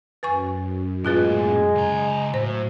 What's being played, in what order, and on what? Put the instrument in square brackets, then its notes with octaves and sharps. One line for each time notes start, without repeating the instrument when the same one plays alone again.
[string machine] F#2 [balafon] B4 G#5 C#6
[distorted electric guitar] A2 A#3 [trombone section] G#3 [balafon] F4 G#4 B4
[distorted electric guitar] C#2 A#5
[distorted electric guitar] A2 [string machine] F#3 [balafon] C5